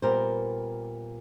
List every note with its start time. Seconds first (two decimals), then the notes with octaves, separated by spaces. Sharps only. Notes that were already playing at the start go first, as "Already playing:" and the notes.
0.02 A#2 G3 B3 A#4 C5